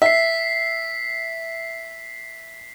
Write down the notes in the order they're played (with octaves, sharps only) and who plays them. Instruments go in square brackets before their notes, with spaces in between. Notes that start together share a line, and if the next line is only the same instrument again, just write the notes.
[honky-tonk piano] E5 [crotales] B6 C7